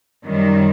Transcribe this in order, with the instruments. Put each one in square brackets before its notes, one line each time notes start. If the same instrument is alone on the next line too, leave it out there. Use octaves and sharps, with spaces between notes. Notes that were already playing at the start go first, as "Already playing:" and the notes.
[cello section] F#2 D#3 G3